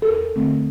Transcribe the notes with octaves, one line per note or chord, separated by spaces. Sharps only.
A4
E2 A#4
D3 A3 C4